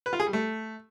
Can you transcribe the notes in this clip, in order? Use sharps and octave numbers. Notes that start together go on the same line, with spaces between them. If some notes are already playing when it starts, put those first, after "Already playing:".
B4
F4
G#4
G3
A3